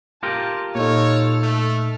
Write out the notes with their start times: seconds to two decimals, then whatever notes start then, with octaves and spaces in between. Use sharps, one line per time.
0.23 F4 G4 A#4 A5
0.75 A#2 D#4 A4 C#5 F6
1.43 A3